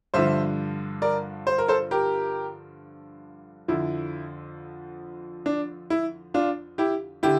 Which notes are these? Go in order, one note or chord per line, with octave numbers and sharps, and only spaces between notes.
G2 D3 F3 C5 E5
A#4 D5
C5
A#4
A4 C5
G4 A#4
F2 D3 F3 E4
D4
E4
D4 F4
E4 G4
D3 E4 G4